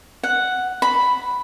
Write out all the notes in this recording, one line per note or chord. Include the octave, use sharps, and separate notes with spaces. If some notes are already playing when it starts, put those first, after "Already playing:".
F#5
B5